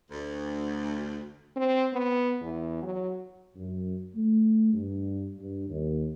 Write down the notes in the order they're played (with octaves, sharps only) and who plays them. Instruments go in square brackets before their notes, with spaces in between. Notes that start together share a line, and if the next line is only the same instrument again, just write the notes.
[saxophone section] D2
[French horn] C4
B3
E2
F#3
[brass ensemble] F#2
A3
G2
G2
D#2